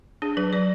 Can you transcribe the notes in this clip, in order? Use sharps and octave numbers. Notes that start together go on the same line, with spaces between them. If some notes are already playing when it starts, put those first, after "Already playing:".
D4 G#4
F#3 B4
F#3 D5